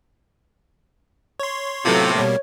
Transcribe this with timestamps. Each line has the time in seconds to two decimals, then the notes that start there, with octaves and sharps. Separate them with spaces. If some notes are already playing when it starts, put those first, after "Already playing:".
1.40 C#5 C6
1.85 A2 C3 F#3 B3 F4 A4
2.15 B2 G3 A#3 C#5